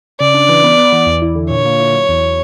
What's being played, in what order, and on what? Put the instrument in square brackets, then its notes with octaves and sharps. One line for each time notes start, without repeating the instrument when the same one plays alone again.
[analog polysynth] C#3 [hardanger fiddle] D5
[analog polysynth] D4
E3
B3
B3
E3
E2
E4
D3
[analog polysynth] A#2 [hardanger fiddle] C#5
[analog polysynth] A#3
E4
F#3
E2